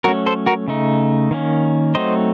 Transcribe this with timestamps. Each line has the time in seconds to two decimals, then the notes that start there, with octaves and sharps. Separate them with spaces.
0.04 F#3 A3 C#4 F#4 A#4
0.26 A4 C5
0.46 F#4 A#4
0.68 C#3 A3 D#4
1.31 D#3 A#3 C#4
1.95 F#3 A3 C4 D#4 C5 D#5